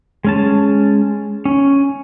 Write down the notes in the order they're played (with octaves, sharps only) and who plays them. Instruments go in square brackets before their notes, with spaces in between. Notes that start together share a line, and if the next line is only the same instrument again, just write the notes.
[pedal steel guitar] G#3 C#4 A5
C#4